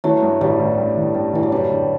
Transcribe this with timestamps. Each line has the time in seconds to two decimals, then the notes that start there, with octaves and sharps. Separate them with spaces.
0.04 E3 F#3 A3
0.23 G2
0.41 A1 G3
0.59 A1
0.78 G2
0.97 A1
1.15 G2
1.33 A1 E3
1.43 F#3
1.52 F#1 G3
1.70 D3